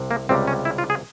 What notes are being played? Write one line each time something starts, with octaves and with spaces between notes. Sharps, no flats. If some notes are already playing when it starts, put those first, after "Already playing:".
Already playing: C2 C3
A#3
C#2 C3 G3 C4
C#4
E4
F4
G#4